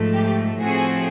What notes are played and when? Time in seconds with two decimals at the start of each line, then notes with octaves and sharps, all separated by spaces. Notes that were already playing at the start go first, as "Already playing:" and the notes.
Already playing: G#2 F3 A3
0.13 G4
0.60 A2 F3 A3 C4 F#4 G#4